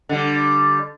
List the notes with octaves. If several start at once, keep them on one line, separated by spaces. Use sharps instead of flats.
D3 G3